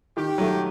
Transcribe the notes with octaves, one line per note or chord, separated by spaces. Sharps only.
D#3 G4
F#3 A3